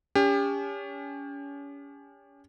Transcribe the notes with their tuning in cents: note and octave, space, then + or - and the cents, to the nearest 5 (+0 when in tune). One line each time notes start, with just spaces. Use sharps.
C#4 +35 G4 +35